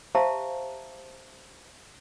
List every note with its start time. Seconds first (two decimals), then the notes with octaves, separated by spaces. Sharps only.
0.15 G4 C5 E5 F5 A5 A#5